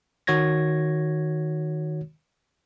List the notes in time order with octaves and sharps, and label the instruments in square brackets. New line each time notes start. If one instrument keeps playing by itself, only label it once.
[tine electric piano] D#3 F#4 C#5 G#6 A#6